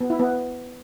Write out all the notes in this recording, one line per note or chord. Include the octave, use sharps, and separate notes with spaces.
B3
E4
B3